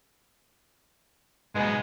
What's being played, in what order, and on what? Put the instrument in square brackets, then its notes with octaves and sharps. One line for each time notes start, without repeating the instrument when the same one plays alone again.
[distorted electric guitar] G#2 B2 [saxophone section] G#3 B3